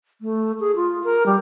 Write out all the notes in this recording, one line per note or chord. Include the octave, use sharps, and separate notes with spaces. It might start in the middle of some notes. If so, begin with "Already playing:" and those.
A3
G#4
F4
A#4
G3